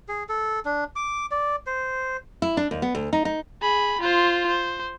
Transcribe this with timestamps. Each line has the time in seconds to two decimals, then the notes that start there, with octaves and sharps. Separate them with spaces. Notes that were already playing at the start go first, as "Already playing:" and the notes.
0.08 G#4
0.29 A4
0.65 D4
0.96 D6
1.31 D5
1.67 C5
2.42 E4
2.57 D4
2.71 D#2
2.82 B3
2.95 D2
3.13 D#4
3.25 D#4
3.62 G#4 B5
4.01 F4 C5
4.48 C5